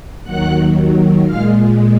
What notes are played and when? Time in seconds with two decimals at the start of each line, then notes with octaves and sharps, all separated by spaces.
0.23 D#2 D#3 F#3 F#5 F#6
1.24 A#2 G#3 F5 F6